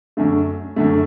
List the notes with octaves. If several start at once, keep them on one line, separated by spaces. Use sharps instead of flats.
F#2 D3 A3
F#2 D3 A3